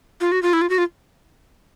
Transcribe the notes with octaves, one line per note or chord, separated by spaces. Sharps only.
F4
F#4
F4
E4
F4
F#4
F4